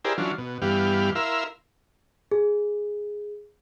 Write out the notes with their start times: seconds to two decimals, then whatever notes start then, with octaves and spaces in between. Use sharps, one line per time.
0.05 E4 G4 G#4 A#4 C5 D5
0.18 E3 F#3 C#4 D4 F4
0.38 B2
0.62 G2 E3 B3 G4 F5
1.15 E4 A#4 E5 F5 C6
2.31 G#4